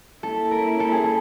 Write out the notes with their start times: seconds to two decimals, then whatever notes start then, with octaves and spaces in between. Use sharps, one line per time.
0.23 A#3 C#4 E4 A4
0.51 A#4
0.80 A4
0.92 G#4
1.04 A4